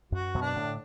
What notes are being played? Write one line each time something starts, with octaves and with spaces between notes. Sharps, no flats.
F#2 F#4
F#2 B2
D4
A2 D3